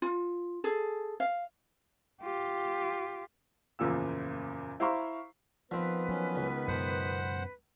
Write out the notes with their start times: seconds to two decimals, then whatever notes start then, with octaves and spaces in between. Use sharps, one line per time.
0.02 F4
0.64 G#4 A4
1.20 F5
2.22 F4 G4
3.79 F#1 E2 A#2 F3 E6
4.80 E4 C5 F5 A#5 C6 C#6
5.71 D#3 F3 B3 C4 B4
6.09 F#3 C#4
6.36 C#2
6.68 F#2 B2 C5 F#5